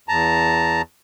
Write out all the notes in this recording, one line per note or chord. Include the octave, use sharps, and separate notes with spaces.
E2 A5 A#5